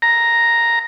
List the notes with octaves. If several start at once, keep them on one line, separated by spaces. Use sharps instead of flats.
A#5